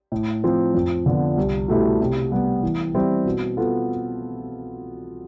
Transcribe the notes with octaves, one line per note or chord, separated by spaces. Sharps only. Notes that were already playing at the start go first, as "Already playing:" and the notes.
A2
F3 C4
F2
D3 F3 B3
C2
B2 A3 E4 G4
C3
G3 B3
E3
G3 C4 E4
B2
B3 F4 A4